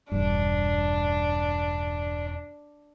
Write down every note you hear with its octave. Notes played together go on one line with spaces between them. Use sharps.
E1 G2 D4